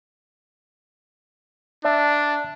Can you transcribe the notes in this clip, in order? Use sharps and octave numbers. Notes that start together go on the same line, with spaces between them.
D4 D5 E5 A5